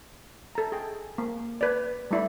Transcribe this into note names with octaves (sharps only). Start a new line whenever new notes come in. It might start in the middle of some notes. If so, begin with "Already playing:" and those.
A4 A#5
G#4 G5
A#3
B4 D5
G3 A3 E4 D5 B5